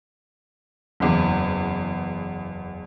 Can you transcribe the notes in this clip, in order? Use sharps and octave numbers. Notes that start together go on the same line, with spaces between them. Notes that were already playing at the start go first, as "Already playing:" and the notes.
F#1 E2